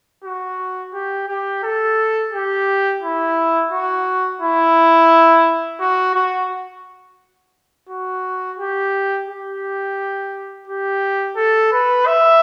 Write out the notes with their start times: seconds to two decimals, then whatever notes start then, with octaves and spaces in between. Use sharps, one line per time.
0.24 F#4
0.93 G4
1.28 G4
1.63 A4
2.32 G4
3.02 E4
3.72 F#4
4.41 E4
5.80 F#4
6.15 F#4
7.89 F#4
8.59 G4
9.28 G4
10.68 G4
11.37 A4
11.72 B4
12.07 E5